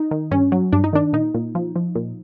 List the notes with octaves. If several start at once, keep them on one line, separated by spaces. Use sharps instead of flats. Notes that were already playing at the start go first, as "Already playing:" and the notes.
Already playing: D#4
D#3
G2 C#4
F#3
G2 D4
D#4
D#3 D4
A#2 D#4
A#2
F3
F3
A#2